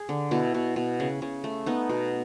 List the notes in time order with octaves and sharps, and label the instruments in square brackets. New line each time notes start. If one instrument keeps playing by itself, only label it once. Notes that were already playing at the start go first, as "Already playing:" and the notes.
Already playing: [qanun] G#4
D3
B2 E4
B2
B2
C#3
C#3
A3
B3 D#4
B2